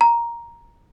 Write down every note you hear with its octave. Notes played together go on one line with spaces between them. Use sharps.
A#5